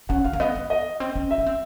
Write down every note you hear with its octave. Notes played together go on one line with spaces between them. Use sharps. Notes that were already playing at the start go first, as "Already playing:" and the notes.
C#4 F#5
C4 F5
A#3
B3 D#5
B3
D#5
C4
C#4
E5
C#4
C4